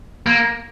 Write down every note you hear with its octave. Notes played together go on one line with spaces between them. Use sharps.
A#3